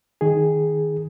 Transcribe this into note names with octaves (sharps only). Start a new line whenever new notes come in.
D#3 G#4